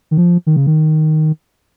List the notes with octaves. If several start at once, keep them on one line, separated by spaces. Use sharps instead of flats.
D#3
F3
D#3
C#3
D#3